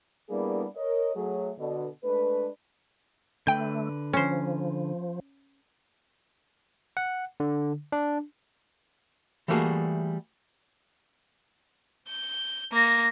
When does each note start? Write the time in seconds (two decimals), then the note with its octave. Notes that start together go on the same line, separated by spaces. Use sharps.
0.30 G3 A#3 B3 D4 E4 G#4
0.76 A#4 C#5 D#5
1.15 F#3 A3 G#4
1.59 B2 D3
2.04 G#3 A3 D4 B4
3.47 D3 A3 B4 G5 G6
4.13 F3 C#4 C5
6.97 F#5
7.40 D3
7.92 D4
9.48 E3 G3 A3 A#3 F#4 G#4
12.08 G6
12.72 A#3 A#6